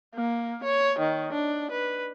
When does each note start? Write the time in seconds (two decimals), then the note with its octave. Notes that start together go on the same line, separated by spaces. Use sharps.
0.15 A#3
0.64 C#5
0.99 D#3
1.33 D4
1.71 B4